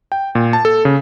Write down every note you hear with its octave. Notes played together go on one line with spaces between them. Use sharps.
G5
A#2
A5
A4
C#3